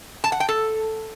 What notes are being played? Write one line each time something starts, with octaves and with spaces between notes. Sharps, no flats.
A5
F#5
G5
A4